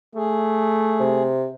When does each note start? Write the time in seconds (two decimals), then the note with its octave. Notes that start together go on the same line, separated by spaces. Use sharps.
0.15 A3 G#4
1.00 C3